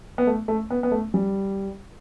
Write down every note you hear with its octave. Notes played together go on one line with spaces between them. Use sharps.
B3
A3
A3
B3
B3
A3
G3